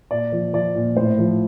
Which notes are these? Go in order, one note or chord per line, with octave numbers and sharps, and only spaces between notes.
A#2 D5
F3
F3 D5
A#2
A2 C5
F3